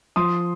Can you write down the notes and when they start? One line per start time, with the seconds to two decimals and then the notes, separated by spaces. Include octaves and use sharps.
0.16 F3 C6 D#6